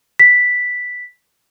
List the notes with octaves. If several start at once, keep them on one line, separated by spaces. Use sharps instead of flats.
B6